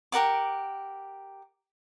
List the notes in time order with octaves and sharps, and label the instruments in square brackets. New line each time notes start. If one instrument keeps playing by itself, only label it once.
[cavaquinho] G4 A#4 F#5 D6